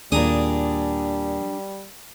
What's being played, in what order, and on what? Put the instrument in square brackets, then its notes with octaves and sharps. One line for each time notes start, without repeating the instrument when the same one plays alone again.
[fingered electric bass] D#2 [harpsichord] A#2 A#5 D#6 [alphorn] G3 [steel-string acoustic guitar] D4 G#4